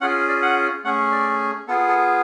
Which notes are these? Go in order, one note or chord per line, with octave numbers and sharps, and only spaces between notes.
C#4 F4 G#4 F#5
D5
F#5
A3 C#4 G#4 F#5
D5
B3 F4 G#4 A4
A4